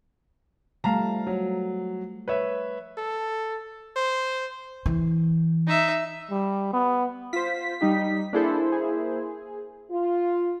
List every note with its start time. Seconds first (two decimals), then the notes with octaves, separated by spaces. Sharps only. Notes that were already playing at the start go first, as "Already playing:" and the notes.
0.84 F3 G3 A3 F5 A5 A#5
1.27 F#3
2.28 B4 C#5 E5
2.98 A4
3.96 C5
4.86 E3
5.67 D#4 E5
6.31 G3
6.73 B3
7.33 F4 C5 B6
7.81 G3 D#4 G4
8.33 A#3 D4 E4 G#4 A4 C5
8.72 G#4
9.90 F4